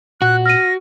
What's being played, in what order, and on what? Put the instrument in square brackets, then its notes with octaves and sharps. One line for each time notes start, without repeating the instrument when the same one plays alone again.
[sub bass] A#2 [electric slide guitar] F#4 [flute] F#6
[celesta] F6 D#7 [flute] A#6